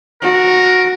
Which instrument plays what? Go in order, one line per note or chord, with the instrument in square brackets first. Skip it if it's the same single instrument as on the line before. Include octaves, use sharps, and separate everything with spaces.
[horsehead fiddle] F#4 [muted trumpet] A#4